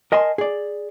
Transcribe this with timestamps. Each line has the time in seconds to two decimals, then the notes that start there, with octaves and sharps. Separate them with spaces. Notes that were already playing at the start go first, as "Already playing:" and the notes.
0.12 A#4 D#5 G#5 A5 C6
0.38 G#4 D5